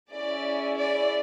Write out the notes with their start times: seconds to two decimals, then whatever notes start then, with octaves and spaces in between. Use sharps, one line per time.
0.11 C#4 E4 G#4 D5
0.76 D5